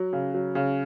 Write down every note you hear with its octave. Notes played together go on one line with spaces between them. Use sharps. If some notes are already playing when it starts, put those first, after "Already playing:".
Already playing: F#3
C#3
F#3
C#3